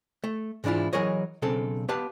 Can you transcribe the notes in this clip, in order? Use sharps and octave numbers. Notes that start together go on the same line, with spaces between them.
A3
G#2 E3 D4 E4 F4
E3 F#3 G#4 A#4 C#5 D#5
B1 C#3 C4 A4
B3 G4 B4 F5 A5